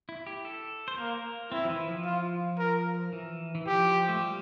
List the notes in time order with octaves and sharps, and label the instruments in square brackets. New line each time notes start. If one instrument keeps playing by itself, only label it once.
[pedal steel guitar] E4
G4
A4
C5
[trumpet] A#3 [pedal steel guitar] A#4
[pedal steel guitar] C4 [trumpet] E4
[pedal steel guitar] F3
E3
F3
[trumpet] F4
A#4
[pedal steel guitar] E3
E3
[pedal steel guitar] F3 [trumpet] G4
[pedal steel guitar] A3
G3